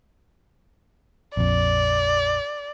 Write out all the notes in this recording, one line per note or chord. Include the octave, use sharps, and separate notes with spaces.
A#1 F2 D5